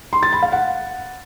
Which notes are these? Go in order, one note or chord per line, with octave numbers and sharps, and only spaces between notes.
C6
A6
B5
F5
F#5